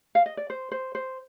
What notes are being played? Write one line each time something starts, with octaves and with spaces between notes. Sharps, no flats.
F5
D#5
D5
C5
C5
C5